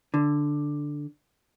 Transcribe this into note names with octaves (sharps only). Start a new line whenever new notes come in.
D3